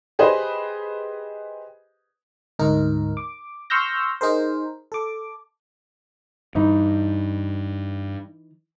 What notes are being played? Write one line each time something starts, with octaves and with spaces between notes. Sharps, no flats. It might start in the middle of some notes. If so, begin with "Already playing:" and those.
G4 G#4 B4 C5 D#5
D2 G#2 D#4 A#4
D6
C6 C#6 E6 F6 G6 A#6
D#4 G#4 A#4 C5
A4 D6
G2 E3 D#4